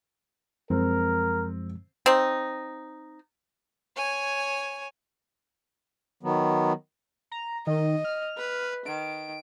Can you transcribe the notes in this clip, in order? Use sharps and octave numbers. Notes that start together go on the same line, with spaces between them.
F#2 F3 G#3 C4 A#4
C4 D#4
C#5 G#5
D#3 F#3 B3
A#5
D#3 D#5
F6
B4
D#3 D7